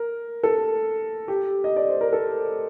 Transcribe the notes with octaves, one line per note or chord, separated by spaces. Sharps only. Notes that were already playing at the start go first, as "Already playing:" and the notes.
Already playing: A#4
A4
G4
D#5
D5
C5
A#4
A4